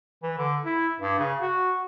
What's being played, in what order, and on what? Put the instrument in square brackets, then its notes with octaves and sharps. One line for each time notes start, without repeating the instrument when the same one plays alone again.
[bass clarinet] E3
D3
E4
G2
C#3
F#4